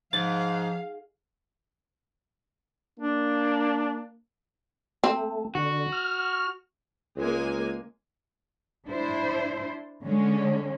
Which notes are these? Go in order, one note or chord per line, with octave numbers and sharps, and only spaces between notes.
G#2 F3 F5 A6
A#3 D4
A3 C4
D3 F#4
F6
C#2 G#3 A#3 G#5
D4 E4 C5
D3 G#3 C#4